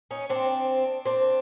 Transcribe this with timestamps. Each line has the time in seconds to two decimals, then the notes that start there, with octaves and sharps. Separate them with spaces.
0.11 C#4 D#4
0.30 C4 D4
1.05 C4 D4